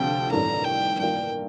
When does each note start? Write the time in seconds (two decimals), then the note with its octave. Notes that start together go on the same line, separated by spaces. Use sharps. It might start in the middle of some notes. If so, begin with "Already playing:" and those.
Already playing: D2 C3 F3 C4 F4 G5
0.31 A1 G2 D#3 A3 A#5
0.65 G5
0.99 G2 D#3 A#3 F4 G5